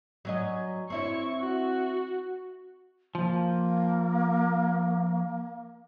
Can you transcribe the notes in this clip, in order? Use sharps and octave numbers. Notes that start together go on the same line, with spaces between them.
F#3 C#4 D#5
C4 E4 C#5 C#6
F#4
F3 A#3